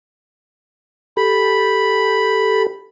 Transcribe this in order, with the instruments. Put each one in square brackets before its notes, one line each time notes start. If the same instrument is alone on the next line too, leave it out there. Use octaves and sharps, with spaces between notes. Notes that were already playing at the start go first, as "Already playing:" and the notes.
[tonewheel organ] G4 A4 [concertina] B5